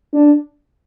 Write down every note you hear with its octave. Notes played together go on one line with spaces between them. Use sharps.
D4